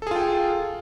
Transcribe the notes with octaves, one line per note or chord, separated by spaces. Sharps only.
F4 G#4 A4 G5